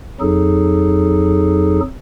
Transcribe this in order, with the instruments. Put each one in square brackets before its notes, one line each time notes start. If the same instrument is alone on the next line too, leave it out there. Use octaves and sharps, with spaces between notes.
[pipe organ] F2 F#3 D#4 G#4 A4